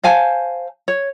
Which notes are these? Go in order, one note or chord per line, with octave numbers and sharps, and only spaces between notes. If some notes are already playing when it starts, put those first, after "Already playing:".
C5 F5 G#5 A5
C#5